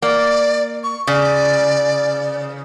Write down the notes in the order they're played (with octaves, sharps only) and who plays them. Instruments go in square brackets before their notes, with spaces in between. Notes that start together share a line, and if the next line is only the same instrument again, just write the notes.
[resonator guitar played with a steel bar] A#3 [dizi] D5
[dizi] C#6
[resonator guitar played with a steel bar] C#3 [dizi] D5